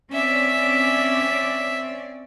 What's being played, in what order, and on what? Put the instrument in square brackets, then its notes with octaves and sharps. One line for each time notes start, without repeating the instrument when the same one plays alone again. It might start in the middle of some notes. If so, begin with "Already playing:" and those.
[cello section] C4 C#4 D5 [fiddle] E5